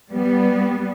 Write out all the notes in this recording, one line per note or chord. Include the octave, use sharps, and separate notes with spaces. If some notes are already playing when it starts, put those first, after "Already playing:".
G3 B3